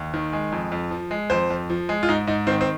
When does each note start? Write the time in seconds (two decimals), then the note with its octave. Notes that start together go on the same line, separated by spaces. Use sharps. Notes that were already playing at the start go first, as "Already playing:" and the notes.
Already playing: D#2
0.14 D#3
0.33 G#3
0.52 F2
0.72 F2
0.91 F3
1.11 G#3
1.30 F2 C5
1.50 F2
1.70 F3
1.89 G#3
2.03 F4
2.09 G#2 D#4
2.27 G#2 D#4
2.47 D#3 C4
2.61 C4